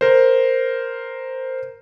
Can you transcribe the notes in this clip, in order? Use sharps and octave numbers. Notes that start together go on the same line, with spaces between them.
A#4 C5